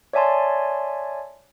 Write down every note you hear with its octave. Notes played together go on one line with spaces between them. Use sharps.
C#5 D5 E5 G#5 A5 C6